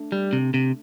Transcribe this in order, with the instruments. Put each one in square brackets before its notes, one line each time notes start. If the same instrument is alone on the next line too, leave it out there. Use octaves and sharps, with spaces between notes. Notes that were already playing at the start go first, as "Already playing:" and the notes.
Already playing: [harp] A3 D4
[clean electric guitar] G3
C3
C3